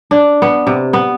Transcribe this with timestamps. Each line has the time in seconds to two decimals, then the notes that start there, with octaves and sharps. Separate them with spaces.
0.11 D4
0.42 B3
0.67 C3
0.93 B3